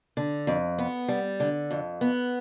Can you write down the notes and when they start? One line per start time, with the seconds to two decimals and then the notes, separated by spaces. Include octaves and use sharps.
0.17 D3
0.47 F2
0.78 B3
1.08 G3
1.40 D3
1.71 F2
2.01 B3